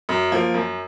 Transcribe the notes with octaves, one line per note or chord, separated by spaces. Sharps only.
F#2
F3 A#3
F#2